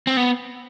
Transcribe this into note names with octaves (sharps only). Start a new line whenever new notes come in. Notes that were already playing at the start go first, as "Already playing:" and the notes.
C4
B3